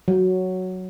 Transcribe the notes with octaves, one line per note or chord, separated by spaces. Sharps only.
F#3